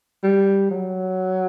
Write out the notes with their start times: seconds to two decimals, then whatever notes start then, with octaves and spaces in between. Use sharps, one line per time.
0.23 G3
0.71 F#3